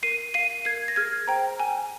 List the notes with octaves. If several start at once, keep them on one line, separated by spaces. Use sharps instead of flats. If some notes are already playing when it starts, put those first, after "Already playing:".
A#4 C7 D#7
F5 C7 D#7
A#4 G#6 C7
A#6
G#4 F6 G#6
C5 G5 A#5
G5 G#5